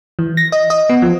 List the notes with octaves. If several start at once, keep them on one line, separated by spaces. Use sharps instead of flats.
E3
A#6
D#5
D#5
B3
F3